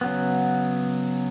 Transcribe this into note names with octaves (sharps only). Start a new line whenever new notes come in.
C#3 F#3 B3